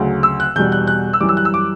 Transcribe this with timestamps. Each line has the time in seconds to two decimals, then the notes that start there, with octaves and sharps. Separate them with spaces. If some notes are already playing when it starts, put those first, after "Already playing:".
Already playing: D2 C#3 F#3
0.23 E6
0.40 F#6
0.56 E2 B2 G3 G6
0.72 F#6
0.87 F#6
1.13 E6
1.21 F#2 E3 G3 D6
1.29 E6
1.37 F#6
1.45 E6
1.54 D6